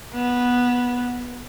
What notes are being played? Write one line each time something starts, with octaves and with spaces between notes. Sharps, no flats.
B3